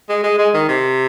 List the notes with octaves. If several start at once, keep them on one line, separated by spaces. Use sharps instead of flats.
G#3
G#3
G#3
D#3
C3